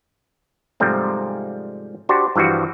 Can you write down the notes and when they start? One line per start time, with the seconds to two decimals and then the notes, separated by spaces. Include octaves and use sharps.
0.80 G#2 C3 F3 G3 A3 C4
2.09 D4 F#4 G4 C5
2.36 G2 E3 F3 G3 F#4